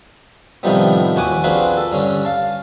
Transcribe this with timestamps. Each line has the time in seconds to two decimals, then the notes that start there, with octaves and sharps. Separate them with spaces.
0.63 A2 C3 D#3 F3 G3 B3
1.16 D#2 F#4 F#5 G#5 D6 D#6
1.44 C4 D4 F4 F#4 G#4 B4
1.77 A4
1.92 G2 D3 C#4
2.25 F5 A5